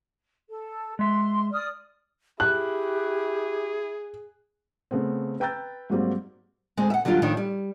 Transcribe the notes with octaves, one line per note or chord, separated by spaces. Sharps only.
A4
G#3 E5 C6
D5 D#6 F6
E4 G4 G#4 F#6
C#3 A3 B3 C4
B4 G5 A#5 E6 G6 A6
G#2 F#3 G3 A#3 C4
D2 G#3 C4
E5 F#5
D3 F#3 G3 D4 F4
A2 D#3 F3 D4
G3